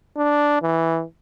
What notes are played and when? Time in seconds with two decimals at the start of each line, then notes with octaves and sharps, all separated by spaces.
0.17 D4
0.62 E3